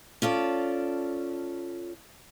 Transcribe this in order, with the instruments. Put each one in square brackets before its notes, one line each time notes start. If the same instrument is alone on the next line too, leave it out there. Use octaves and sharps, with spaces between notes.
[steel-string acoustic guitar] C#4 F4 A4 D5